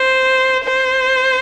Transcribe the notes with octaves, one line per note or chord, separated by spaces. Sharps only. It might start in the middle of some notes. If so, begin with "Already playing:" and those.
Already playing: C5
C5